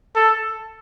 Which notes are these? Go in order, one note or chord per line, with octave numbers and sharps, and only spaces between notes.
A4